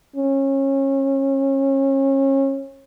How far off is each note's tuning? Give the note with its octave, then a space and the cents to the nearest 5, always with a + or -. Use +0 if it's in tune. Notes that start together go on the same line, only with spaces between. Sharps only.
C#4 -30